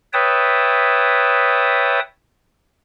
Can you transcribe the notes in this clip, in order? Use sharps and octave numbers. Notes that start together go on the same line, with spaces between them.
B4 C#5 E5 G5 A5 D#6